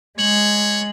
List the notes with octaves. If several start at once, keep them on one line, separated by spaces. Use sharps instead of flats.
G#3 C#5 F#7